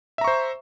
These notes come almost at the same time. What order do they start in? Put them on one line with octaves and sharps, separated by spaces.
E5 A#5 C#6 C5